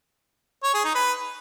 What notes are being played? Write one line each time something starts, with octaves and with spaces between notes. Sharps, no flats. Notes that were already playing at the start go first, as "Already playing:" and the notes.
C#5
G#4
D#4
B4